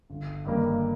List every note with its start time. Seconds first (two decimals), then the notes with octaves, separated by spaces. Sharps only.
0.10 G1
0.45 G2 D#3 G3 A#3